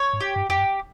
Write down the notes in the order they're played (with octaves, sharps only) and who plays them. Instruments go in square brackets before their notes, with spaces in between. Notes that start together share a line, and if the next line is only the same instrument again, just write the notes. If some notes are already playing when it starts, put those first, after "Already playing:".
Already playing: [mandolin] C#5
[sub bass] G#2
[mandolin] G4
[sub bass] G2
[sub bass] F2 [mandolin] G4
[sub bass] G2